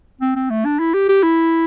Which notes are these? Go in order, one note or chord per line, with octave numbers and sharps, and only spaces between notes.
C4
C4
A3
D4
E4
G4
G4
E4